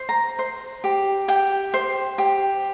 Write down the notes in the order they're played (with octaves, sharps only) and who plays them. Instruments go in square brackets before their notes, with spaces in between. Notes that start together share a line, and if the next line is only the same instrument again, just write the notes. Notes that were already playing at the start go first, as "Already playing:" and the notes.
Already playing: [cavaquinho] C5
A#5
C5
G4
G4 G5
C5
G4